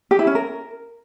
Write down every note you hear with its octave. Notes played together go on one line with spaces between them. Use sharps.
G4
E4
C#4
A#4